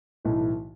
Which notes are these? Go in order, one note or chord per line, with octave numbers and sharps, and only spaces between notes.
B1 A2 E3